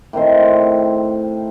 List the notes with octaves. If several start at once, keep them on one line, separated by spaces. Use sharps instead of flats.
A2 D#3 C4 C5